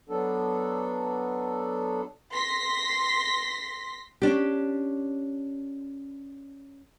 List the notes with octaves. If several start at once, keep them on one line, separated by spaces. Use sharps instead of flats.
F#3 B3 D4 A4
C6 A#6 B6
C#4 D4 G4